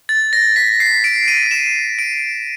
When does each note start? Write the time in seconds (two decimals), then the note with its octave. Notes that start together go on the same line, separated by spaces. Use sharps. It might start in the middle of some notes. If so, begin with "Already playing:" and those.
0.09 A6
0.33 A#6
0.56 B6
0.80 C7
1.04 D7
1.28 D#7
1.51 E7
1.99 D7